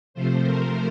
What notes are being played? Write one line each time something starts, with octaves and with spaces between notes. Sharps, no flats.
C3 F3 A3 C5
A#4